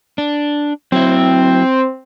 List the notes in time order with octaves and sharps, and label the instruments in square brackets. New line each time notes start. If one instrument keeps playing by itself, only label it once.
[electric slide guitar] D4
[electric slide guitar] F#3 E4 [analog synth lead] C4